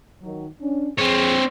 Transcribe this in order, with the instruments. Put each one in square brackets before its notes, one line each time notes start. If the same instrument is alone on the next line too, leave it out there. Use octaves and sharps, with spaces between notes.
[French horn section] D#3 F#3
C#4 D4
[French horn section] F2 G#4 [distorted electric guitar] C4 C#5